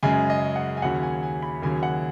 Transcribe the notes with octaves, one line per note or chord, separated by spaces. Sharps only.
F#2 C#3 G#3 G#5
D#5
F#5
G#5
D#2 C#3 F#3 F#5
G#5
G#5
B5
D#2 C#3 F#3 G#5
F#5